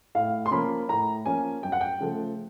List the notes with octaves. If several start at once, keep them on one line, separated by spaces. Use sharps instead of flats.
A2 F5
C6
F3 A#3 C#4 B5
A2 A#5
F3 A#3 C#4 G#5
F#2 G5
F#5
G5
C#3 F3 A3